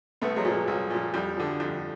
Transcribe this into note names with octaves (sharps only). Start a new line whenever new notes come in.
C2 A3 B3
F#3 G#3
A#2 F3
F#3
C2
A#2 F3
F2 G3
D3 F3
F2